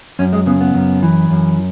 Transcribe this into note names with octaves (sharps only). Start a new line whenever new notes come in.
F#2 C#4
G#3
C#3 B3
B3
F#2
E3
F#2